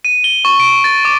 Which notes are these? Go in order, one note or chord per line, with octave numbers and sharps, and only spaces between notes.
D#7
G7
C#6
D7
A6
D6